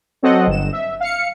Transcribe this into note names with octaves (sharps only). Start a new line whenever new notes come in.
F#3 C4 A4 D#5 F#5
G1 E7
E5
F5 C#7